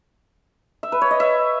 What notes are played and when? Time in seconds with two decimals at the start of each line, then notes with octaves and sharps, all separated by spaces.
0.83 E5
0.92 B4
1.01 C#5
1.11 D#5
1.20 E5